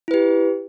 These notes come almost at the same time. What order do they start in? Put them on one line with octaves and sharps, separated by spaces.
E4 B4 G4